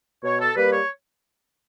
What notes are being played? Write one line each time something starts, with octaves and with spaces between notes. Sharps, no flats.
B2 C#5
A4
G3 A#3 B4
C#5